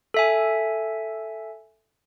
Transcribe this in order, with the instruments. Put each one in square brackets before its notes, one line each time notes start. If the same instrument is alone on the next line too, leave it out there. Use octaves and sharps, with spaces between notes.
[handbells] A4 E5 G#5